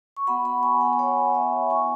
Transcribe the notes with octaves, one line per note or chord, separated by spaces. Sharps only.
C#6
B3 F#4 F#5 B5
F#5 B5
G#5 C#6
F#5 B5
G#5
C#5 F#5
E5 G#5
B3 E4 G#5 C#6